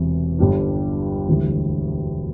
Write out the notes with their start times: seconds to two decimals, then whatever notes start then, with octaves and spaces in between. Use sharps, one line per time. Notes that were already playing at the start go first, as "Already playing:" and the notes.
Already playing: E1 E2 C3
0.39 G1 G2 G3 D4
1.28 E1 D2 D3 G3 E4